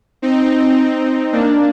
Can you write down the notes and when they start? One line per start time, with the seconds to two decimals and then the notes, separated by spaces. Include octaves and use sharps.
0.22 C4 D#4
1.33 A#3 D4